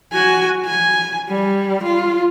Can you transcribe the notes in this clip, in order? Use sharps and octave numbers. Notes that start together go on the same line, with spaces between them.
F#4 G#5
G#5
G3
F4